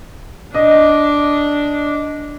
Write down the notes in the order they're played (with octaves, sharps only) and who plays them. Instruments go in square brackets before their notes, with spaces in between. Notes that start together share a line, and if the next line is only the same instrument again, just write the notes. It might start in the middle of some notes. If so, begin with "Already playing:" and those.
[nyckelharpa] D4 [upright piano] D#5